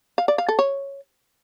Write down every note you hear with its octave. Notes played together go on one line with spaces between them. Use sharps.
F5
D5
F5
A4
C#5